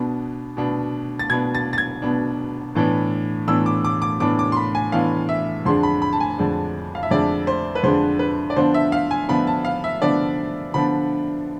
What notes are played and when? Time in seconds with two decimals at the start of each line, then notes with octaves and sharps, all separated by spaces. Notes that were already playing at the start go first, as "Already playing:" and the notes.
Already playing: B2 B3 D4
0.57 B2 B3 D4
1.19 A6
1.30 B2 B3 D4 G#6
1.55 A6
1.73 A6
1.78 G#6
2.02 B2 B3 D4
2.75 A2 E3 B3 D4
3.47 A2 E3 B3 D4 E6
3.66 D6
3.85 D6
4.02 D6
4.20 A2 E3 B3 D4 D6
4.39 D6
4.52 C6
4.57 B5
4.75 G#5
4.92 A2 E3 B3 D4 F5
5.29 E5
5.65 F2 D3 G#3 D4 C6
5.83 B5
6.02 B5
6.13 A5
6.20 G#5
6.38 F2 D3 G#3 D4
6.95 F5
7.03 E5
7.11 F2 D3 G#3 D4 D5
7.47 C5
7.75 B4
7.83 F2 D3 G#3 D4 C5
8.19 B4
8.50 D5
8.56 D3 F3 B3 D4 C5
8.74 E5
8.92 F5
9.11 G#5
9.29 D3 F3 B3 D4 B5
9.47 A5
9.65 F5
9.84 E5
10.02 D3 F3 B3 D4 D5
10.74 D3 F3 B3 D4 B5